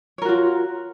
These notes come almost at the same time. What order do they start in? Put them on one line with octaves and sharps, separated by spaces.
C#5 A#4 F#4 F4